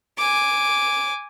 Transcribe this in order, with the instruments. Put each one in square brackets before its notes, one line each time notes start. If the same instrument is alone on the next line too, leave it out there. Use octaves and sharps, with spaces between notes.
[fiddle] G#5 D6